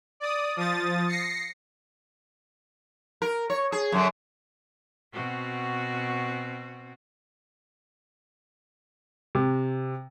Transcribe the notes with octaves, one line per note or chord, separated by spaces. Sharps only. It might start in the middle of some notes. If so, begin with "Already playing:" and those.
D5 D#6
F3 D#6 A6
A#6 C7 C#7
A#4
C#5
G#4
F#2 D3 F#3
B2 C4 F#4
C3